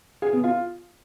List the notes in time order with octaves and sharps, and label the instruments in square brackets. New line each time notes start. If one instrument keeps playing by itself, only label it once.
[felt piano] G#4
B3
F4